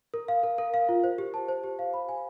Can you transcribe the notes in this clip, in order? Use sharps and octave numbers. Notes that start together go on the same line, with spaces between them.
A#4
F5
A#4
A#4
F5
F4
C5
G4
A5
C5
G4
F5
B5
G#5